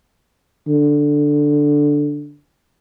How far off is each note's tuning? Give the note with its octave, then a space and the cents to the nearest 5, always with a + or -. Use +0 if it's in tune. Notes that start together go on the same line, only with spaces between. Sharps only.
D3 +0